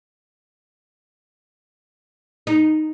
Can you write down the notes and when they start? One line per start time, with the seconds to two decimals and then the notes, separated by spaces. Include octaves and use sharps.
2.47 D#4